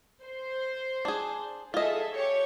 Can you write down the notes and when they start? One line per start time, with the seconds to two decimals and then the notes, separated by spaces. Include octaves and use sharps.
0.23 C5
1.05 D4 G#4
1.74 F4 G#4 A4 D#5 E5
2.14 G4 C#5 C#6